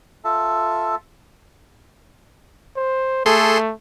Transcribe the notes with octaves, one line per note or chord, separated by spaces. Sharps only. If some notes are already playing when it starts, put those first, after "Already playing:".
F4 A4 E5 A5
C5
A3 G#4 A4 C6